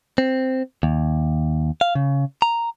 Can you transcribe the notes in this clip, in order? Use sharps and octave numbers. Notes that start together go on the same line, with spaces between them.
C4
D#2
F5
C#3
A#5